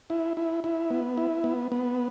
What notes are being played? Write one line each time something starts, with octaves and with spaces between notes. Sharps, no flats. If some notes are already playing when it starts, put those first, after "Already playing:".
E4
E4
E4
B3
E4
B3
B3